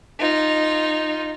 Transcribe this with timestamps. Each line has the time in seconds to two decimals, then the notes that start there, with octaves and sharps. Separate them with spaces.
0.20 D#4 F4